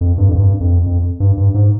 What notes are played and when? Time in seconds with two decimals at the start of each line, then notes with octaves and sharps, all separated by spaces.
0.01 F2
0.18 G2
0.29 F2
0.35 G2
0.60 F2
0.86 F2
1.20 G2
1.37 G2
1.54 G#2